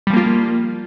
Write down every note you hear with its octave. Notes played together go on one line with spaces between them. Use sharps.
F3 G3 A#3 F4